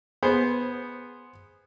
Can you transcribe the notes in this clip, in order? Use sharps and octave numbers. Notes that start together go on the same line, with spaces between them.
B3 G#4 C5